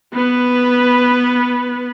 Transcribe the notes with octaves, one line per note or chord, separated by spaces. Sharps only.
B3 B4